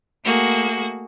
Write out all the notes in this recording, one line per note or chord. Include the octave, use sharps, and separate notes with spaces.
A3 A#3 F#4 G#4